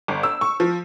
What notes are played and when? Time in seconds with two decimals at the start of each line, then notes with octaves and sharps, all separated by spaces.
0.08 G1
0.23 E6
0.41 C#6
0.60 F3